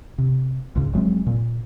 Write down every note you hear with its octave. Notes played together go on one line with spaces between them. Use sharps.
C3
C#2 G#2 C#3
F1 F#3 G#3 C4
A#2